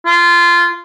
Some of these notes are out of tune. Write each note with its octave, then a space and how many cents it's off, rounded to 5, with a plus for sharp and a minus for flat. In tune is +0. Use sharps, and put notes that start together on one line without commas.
F4 -15